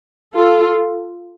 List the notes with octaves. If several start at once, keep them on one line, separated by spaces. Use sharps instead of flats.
F4 A4